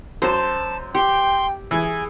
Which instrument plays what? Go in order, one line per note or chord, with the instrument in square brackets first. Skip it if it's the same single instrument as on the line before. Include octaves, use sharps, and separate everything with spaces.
[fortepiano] F#2 [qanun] C5 [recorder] A5
[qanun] G4 [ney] G5 [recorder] C6
[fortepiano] E3 [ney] G#4 [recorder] G#5